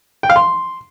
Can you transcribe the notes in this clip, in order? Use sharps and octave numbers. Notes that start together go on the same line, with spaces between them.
G5
F5
C6